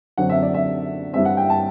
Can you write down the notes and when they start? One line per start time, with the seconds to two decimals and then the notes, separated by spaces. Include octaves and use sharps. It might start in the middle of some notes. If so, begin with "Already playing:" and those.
0.18 F#2 D3 F#3 C4 F#5
0.29 E5
0.42 D5
0.54 E5
1.13 G2 E3 G3 C4 E5
1.25 F#5
1.37 G5
1.50 A5